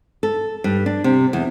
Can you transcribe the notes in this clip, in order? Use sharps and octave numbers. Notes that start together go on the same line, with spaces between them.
A4
G2
D4
C3
E2